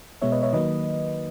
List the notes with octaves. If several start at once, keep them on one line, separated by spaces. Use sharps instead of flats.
B2 G#3 B3 C#5 E5
B4 D#5
C#5 E5
D#3 F#3 A#3 B4 D#5